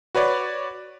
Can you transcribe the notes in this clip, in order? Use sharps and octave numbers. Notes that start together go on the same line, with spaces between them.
F#4 B4 C#5 D5